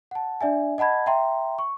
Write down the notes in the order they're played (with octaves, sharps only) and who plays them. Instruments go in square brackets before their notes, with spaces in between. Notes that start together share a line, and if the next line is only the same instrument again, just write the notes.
[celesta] F#5 A5
D4 D5 E5 G#5
D#5 F#5 A5 B5 G#6
E5 G5 A#5 C6
C#6